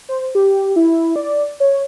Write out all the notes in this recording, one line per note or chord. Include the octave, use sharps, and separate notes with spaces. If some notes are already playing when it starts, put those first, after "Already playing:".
C5
G4
E4
D5
C#5